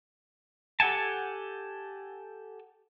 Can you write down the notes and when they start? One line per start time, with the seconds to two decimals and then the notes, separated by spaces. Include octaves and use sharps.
0.80 G4 A4 F#5 G#5 A5